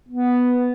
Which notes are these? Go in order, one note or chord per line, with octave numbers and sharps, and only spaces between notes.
B3